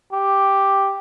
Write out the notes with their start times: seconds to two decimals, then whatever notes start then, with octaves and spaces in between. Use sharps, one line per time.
0.12 G4